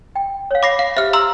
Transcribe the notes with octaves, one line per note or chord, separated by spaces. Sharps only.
G5
C#5 F5
B5 D6 A#6 C7
F5
G4 C5 E5 F6
A#5 C6 E6